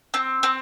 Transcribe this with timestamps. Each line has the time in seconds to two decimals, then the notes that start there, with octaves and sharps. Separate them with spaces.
0.14 C4
0.43 C4